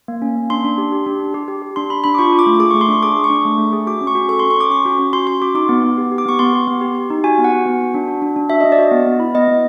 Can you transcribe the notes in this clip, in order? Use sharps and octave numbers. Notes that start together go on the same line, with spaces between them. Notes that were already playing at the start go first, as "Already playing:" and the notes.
A#3
C#4
A#3
D4 C6
D4
G4
G4
D4
G4
G4
G4
G4
D4 C6
D4 B5
D4 B5
D6
F4 C#6
F4
D6
A3
G#4 D6
C#6
A3
C6
D4 C#6
G#4 D6
G#4
C#6
D4
A3
A3
G#4
F#4 D6
C#4
C#6
F#4
A4 C#6
C6
C#4
C#6
C#4 D6
C#4 C#6
F#4
C#4
F#4 C6
F#4 C6
F#4 D6
D#4 D6
B3
B3
G4
G4
D6
B3 C#6
B3 C6
G4
B3
G4
G4
D#4
F#4 G#5
B3
F#5
F#4
B3
F#4
D4
F#4
D4
D4
F#4 E5
D4 D#5
D5
F#4 D#5
B3
B3
E4
B3 D#5
B3